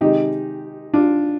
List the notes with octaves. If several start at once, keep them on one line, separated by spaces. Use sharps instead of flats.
C3 D#3 G#3 D#4 G4
D4 F4